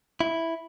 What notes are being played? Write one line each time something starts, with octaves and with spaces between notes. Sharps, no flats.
E4